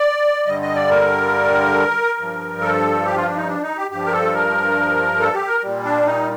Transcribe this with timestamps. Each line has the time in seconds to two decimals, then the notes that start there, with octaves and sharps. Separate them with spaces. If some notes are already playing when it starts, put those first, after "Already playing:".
Already playing: D5
0.46 G2 D3 G3 D#5
0.62 D#5
0.75 D5
0.90 A#4
2.18 G2 F3
2.61 A4
3.05 G4
3.16 F4
3.26 D4
3.37 D#4
3.47 D4
3.62 D#4
3.77 G4
3.91 G2 F3 G4
4.06 A#4
4.12 A4
4.34 A#4
5.20 A4
5.34 G4
5.48 A#4
5.63 A#2 G3
5.84 D4
6.05 D#4